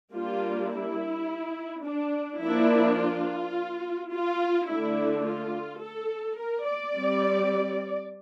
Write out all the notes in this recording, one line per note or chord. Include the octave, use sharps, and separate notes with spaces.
G3 A#3 D4 F4
E4
D4
F3 A#3 D4 E4
F4
F4
D3 A3 D4 E4
F4
A4
A#4
D5
G3 C4